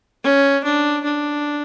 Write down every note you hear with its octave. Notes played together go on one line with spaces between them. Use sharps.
C#4
D4
D4